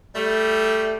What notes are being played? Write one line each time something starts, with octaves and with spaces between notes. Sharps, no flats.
G3 A3